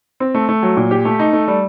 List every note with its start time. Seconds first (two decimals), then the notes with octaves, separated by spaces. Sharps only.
0.20 C4
0.34 A3
0.49 A3
0.63 F#3
0.77 A#2
0.91 G4
1.05 A3
1.19 D#4
1.33 A3
1.48 G3